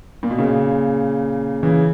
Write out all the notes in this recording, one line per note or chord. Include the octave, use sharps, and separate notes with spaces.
A#2
B2
A#2 C#3
C#3 E3